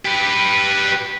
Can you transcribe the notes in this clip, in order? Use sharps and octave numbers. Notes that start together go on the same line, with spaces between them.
G4 B4